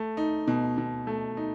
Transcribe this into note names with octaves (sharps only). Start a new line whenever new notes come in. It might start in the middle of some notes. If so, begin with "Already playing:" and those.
Already playing: A3
D#4
B2
B2
A3
D#4